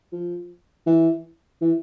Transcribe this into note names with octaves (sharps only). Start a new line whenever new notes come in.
F3
E3
E3